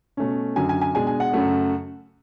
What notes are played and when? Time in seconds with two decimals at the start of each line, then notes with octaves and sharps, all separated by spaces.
0.17 B2 A3 C#4
0.56 F#2 D3 F#3 G#5
0.69 G#5
0.81 G#5
0.94 B2 G#3 D4 G#5
1.07 G#5
1.20 F#5
1.33 F#2 C#3 F#3 A3